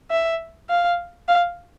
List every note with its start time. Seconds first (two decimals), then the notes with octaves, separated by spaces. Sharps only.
0.11 E5
0.70 F5
1.28 F5